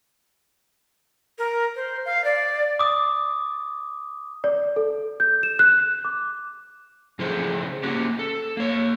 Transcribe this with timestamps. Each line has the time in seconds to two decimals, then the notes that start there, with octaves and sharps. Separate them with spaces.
1.38 A#4
1.75 C5
2.05 F5
2.24 D5
2.79 D6 D#6
4.44 D5
4.76 A4
5.20 G6
5.43 E7
5.59 F#6
6.05 D6
7.19 C#3 F3 E4 G#4 A4 C5
7.83 A#3 C#4 F#4 G4
8.19 A4
8.57 A#3 C#5